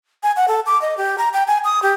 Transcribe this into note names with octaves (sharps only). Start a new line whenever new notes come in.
G#5
F#5
A4
D6
D#5
G4
A#5
G5
G#5
D#6
G4